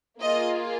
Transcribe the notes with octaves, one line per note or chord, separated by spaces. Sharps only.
A#3 F4 G#4 D#5